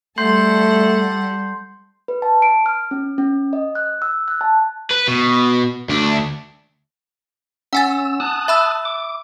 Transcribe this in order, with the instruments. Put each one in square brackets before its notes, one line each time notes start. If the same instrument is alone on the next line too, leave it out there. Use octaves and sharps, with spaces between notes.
[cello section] G3 [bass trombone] A3 [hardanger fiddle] A4 F#5 [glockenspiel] C6 G6 C7
[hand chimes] B4
A5
D7
F6
C#4
C#4
D#5
F#6
E6
F#6
A5
[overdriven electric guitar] B4
B2
D2 D4
[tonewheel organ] C#4 E6 [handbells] F#5 G#5 A6
[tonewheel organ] A5 D#6 F#6
[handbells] E5 B5 E6
[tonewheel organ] D6